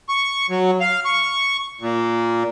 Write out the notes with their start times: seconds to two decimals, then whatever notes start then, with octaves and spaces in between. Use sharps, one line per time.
0.09 C#6
0.50 F#3
0.80 F5
1.05 C#6
1.81 A#2